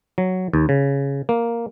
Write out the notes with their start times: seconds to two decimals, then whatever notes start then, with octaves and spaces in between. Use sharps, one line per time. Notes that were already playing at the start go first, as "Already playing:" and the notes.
0.18 F#3
0.53 D#2
0.69 C#3
1.29 A#3